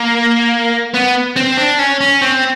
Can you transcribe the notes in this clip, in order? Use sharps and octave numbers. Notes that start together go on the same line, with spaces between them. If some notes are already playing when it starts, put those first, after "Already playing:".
Already playing: A#3
B3
C4
D4
C#4
C#4
C4